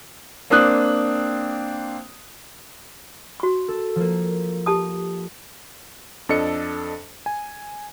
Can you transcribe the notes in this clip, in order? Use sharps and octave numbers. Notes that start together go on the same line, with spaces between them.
A#3 C4 D4 D#6 F#6
F#4 C#6
A4
F3 A#3
G4 A5 D#6
F2 D4 A4 D#5 C#7
G#5